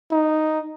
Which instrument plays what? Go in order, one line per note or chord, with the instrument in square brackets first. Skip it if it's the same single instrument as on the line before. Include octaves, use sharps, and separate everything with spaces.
[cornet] D#4